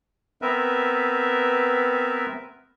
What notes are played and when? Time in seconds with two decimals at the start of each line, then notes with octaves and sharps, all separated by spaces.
0.42 B3 C4 A#4 B4 E5